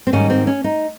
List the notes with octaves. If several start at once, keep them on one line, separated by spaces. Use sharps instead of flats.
C4
G#2 D#3 G3 C#4
C4
C#4
D#4